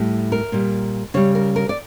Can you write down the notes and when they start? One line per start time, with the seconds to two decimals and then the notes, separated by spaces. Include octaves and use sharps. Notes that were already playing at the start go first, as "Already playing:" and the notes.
Already playing: A2 G3
0.32 A#4
0.52 A#2 G3
1.14 C#3 G3 C#5
1.35 A#4
1.56 A#4
1.69 D5